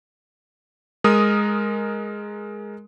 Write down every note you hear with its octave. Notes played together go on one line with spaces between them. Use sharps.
G#3 A#4 D#6